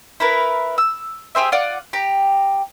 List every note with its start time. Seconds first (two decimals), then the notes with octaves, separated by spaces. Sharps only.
0.20 E4 A#4 B4
0.78 E6
1.35 G4 G#4 C5 E5
1.52 F4 D5 F#5
1.93 G4 A#5